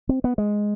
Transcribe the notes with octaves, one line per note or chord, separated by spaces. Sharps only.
C4
B3
G#3